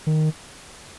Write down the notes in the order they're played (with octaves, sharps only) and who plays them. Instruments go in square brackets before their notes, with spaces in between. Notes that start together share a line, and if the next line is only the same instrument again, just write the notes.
[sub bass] D#3